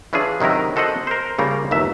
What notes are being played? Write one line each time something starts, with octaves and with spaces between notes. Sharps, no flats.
E3 C#4 D4 F4 G#4
C3 D#3 F#3 E4 A#4
F#4 A4 C5 D#5 F#5
A#4 C5
C#3 G3 A#3 F4 A#4
G1 D#2 F#3 E5